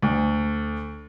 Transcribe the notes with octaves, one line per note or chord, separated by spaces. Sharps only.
D2